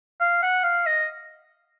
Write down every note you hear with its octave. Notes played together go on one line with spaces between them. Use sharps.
F5
F#5
F5
D#5